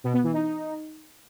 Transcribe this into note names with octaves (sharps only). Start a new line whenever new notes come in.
B2
B3
E3
D#4